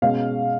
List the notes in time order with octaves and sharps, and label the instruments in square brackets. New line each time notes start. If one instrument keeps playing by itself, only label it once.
[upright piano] B2 G#3 C#4 F5